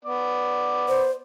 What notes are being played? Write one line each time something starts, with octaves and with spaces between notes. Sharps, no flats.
B3 D5
C5